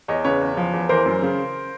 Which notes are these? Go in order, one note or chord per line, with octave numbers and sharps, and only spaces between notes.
E2 C#5 D#5
C#3 B4 C#5
E2
F3
E2
E3 A#4 C5
F#2
C#3